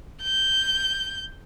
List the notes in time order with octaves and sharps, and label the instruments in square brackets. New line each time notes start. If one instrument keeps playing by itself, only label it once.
[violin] G6